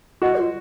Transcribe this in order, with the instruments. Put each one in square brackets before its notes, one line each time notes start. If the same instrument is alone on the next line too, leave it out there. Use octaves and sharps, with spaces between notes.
[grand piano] F#4 [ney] D#5
[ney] F4